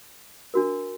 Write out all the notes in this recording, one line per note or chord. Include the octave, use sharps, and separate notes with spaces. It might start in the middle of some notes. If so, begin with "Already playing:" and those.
D4 F#4 A#4